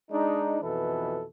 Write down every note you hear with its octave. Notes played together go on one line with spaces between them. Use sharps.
G#3 D4 D#4
F2 B2 E3 A4 B4